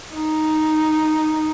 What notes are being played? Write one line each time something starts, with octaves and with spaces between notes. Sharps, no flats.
D#4